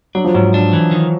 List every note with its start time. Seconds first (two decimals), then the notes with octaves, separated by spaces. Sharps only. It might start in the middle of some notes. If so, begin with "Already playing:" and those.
0.15 F#3 D4
0.25 F3
0.34 G#2 F#3
0.54 D4
0.73 E3
0.91 D#3